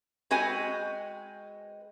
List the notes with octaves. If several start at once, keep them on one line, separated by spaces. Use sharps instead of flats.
G#3 C4 F#4 B4 D#5 G#5